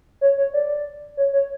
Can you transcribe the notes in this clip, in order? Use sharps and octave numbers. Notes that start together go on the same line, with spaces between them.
C#5
C#5
D5
C#5
C#5